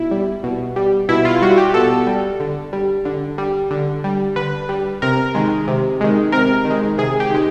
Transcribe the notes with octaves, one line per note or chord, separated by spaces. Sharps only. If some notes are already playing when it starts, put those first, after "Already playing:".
Already playing: B2 E4
G3
B2
G3
B2 E4
F4
G3 F#4
G4
B2 A4
G3
D3
G3
D3
G3
D3
G3
D3 B4
G3
C3 A#4
D#3 G#3
C3
D#3 G#3
C3 A#4
D#3
G#3
C3 G#4
G4
D#3 G#3